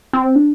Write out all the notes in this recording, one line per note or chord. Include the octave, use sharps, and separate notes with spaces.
C4
D4